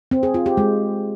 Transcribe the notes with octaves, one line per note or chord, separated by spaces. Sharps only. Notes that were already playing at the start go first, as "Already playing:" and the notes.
C4
G#4
F4
G4
G#3